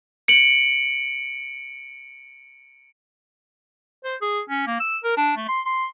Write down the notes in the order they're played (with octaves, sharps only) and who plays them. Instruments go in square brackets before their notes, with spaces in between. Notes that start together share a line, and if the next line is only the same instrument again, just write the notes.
[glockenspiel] C#7 D7 F#7
[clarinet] C5
G#4
C#4
A#3
E6
A#4
D4
A3
C6
C6